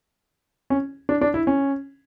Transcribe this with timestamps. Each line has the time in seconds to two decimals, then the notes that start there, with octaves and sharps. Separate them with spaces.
0.70 C#4
1.09 D4
1.21 D4
1.34 E4
1.47 C#4